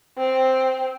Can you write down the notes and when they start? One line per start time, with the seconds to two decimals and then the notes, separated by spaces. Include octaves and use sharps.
0.18 C4